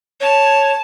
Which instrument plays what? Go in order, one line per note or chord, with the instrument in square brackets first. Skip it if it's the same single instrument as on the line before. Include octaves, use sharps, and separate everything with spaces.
[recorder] C#5 [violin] A5